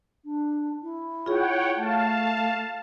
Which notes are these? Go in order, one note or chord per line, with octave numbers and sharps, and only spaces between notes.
D4
E4
F4 G#4 C#5 F#5 G5
A3 F5 A5